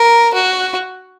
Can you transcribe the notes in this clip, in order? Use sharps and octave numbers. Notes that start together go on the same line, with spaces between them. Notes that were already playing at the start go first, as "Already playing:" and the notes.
Already playing: A#4
F#4